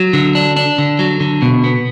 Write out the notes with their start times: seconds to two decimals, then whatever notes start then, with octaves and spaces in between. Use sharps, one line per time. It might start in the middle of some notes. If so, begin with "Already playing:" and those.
Already playing: F#3
0.13 D3
0.35 D4
0.56 D4
0.78 D3
0.99 F#3
1.20 D3
1.42 B2
1.64 B3